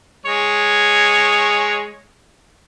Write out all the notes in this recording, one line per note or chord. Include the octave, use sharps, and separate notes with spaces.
G#3 C#5